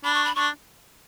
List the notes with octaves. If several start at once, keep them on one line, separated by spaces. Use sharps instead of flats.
D4 B5
C#6
B5
D4 C#6